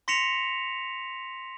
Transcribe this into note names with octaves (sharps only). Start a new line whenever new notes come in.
C6 A#6 B6 C#7 E7 F7